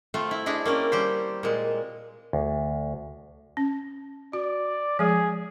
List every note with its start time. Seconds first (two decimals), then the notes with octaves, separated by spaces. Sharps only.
0.14 A3 C4 F4
0.31 E4
0.46 D4 E4 G#4 D#5
0.65 A#3 C4 C#4 D5
0.92 G3 G4 C5
1.43 A#2 G#3
2.33 D2
3.57 C#4
4.33 F#4 D5
4.99 F3 G#3 G#4